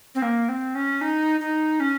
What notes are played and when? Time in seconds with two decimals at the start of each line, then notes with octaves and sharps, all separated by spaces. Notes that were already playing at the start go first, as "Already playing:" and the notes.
0.15 C4
0.22 A#3
0.49 C4
0.75 C#4
1.01 D#4
1.40 D#4
1.80 C#4